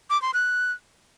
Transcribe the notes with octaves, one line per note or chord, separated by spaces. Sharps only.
D6
C6
F#6